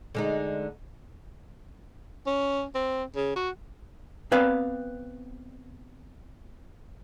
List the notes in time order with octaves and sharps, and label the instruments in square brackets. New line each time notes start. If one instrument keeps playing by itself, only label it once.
[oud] D3 G#3 D#4
[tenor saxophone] C#4
C4
C#3
F#4
[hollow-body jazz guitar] B3 C4 B4 D5 F5